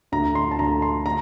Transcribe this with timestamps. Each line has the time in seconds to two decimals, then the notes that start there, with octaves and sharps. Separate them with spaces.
0.12 D2 A#5
0.35 C6
0.51 A5
0.59 D2 A#5
0.82 C6
1.06 A#5